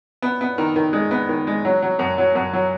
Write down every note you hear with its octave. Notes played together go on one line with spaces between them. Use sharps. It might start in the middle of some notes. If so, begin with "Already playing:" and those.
B3
B3
D#3
D#3
G#3
B3
D#3
G#3
F#3
F#3
F#2
F#3
F#2
F#3